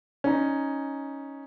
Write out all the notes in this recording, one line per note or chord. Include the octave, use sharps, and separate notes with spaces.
C#4 D#4